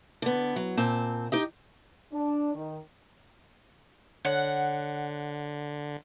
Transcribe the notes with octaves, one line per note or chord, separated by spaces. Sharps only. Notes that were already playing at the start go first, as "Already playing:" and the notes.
D3 B3
F#3
A#2 C4 A5
D#4 G4 D#5
D4
D#3
D3 C#5 F#5